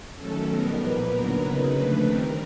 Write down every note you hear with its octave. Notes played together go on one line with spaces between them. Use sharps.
D#3 F#3 A3 C#4 A4
B2 G3 B3 D#4 A#4
A#2 F3 A#3 B4
D#2 D3 F#3 B3 A#4
C#3 F#3 A#3 D#4 B4
D3 F3 A3 D4 B4
D#3 G3 C4 A#4